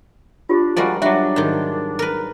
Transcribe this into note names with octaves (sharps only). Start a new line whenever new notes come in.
D4 F4 G4
F3 G3 G#3 F#4 A#4 D5
F#3 G3 D4 F#4 E5
G#2 D#3
A#4 B4